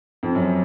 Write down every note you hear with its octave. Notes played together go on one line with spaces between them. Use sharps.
F2
F#2